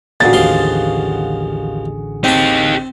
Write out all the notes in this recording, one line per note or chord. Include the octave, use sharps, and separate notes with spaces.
A1 A#2 D3 F#4 G#4 A6
D#2 F3 C6
C4 D#4 G4 A5